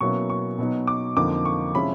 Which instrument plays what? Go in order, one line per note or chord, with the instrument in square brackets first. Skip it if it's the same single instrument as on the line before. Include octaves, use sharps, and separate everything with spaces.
[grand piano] B2 F#3 A#3 C#4 E4 C#6
C#6
B2 F#3 B3 D#4
D6
F2 D3 F3 A#3 D#4 D6
C#6
C3 F3 G#3 C#4 E4 B5